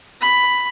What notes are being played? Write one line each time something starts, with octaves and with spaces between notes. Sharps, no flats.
B5